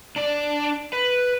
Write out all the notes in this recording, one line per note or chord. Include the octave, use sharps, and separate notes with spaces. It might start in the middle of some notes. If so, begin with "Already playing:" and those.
D4 D5
B4